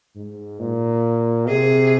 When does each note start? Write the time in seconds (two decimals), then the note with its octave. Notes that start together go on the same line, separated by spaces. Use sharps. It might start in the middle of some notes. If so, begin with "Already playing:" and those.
0.16 G#2
0.60 A#2
1.48 C3 G#4